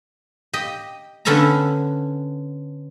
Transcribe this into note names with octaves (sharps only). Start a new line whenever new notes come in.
G4 D#5
D3 B3 C#4 A4 A5 A#5